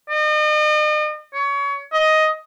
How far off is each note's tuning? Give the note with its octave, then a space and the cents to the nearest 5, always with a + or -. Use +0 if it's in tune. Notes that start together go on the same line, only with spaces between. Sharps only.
D#5 -40
C#5 +25
D#5 +10